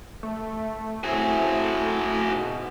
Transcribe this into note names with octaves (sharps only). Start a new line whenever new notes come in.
A3
A2 C4 E4 F#4 G#4
G#2 B2